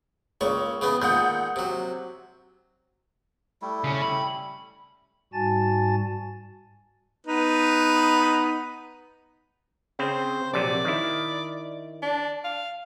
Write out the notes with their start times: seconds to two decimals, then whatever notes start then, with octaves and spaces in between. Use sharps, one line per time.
0.41 C#2 A#3 C#5 C#6
0.81 C#3 E3 B3
1.02 A#2 D#3 G#3 F#5 G6
1.56 C3 F#3
3.62 G3 A3 E4
3.84 C#3 C#4
4.02 B5
5.33 G#2 G3 F#4 G#5 A5 A6
7.27 B3 D#4 B4
9.99 C#3 C4 C5
10.53 A#1 C3 F#3 D5
10.85 D#3 E4
12.02 D4
12.44 F5